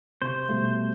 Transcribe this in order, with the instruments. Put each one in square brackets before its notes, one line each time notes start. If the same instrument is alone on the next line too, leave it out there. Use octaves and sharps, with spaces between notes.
[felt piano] C3 C#6 [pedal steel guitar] C5
[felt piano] B2 G3 A3